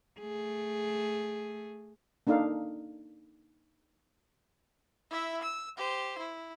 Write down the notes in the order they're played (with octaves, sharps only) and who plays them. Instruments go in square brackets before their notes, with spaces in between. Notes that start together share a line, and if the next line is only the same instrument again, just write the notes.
[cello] A3 G#4
[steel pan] A#3 D4 D#4 A4 F5
[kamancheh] E4 E5
E6
G4 C5
E4